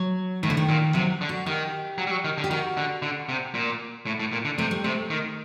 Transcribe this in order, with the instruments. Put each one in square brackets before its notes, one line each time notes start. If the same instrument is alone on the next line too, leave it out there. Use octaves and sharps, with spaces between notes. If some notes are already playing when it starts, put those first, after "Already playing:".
Already playing: [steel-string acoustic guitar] F#3
[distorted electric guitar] A2 [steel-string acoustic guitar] D#3
[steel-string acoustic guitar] D3
D#3
[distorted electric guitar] A#2
[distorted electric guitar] C3 [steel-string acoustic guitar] F#3
[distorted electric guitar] D3
[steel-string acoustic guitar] F#4
[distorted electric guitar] D#3 [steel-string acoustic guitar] G4
[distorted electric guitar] F#3
G3
F#3
D#3
D3
[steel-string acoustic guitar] G4
[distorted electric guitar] D#3 [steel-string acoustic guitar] F#4
[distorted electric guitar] D3
D3
C3
A#2
A2
A2
A#2
D3
[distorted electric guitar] C3 [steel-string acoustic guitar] A3
[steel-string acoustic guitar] G3
[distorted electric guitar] C3 [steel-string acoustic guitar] A3
[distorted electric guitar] D#3